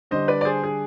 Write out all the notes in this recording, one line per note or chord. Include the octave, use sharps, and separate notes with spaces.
D3 G3 D4 C5 D#5
B4 D5
D5
G#4 C5
G#4